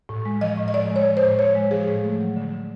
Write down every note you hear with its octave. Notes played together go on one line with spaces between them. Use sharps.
A2
G#3
F3 D#5
A2
D#5
A2 D5
G#3
C#5
F3
C5
A2
A2 C#5
G#3
F3 G#4
A2
A3
F#3
D3